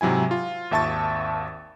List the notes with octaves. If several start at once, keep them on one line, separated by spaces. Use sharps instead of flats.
G#2 C3 F#3 E4 G#5
F4
G#1 D#2 E5 A5 C#6 A6